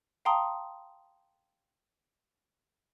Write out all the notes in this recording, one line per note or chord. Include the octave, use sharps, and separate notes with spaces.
F5 G5 A5 A#5 C6 D#6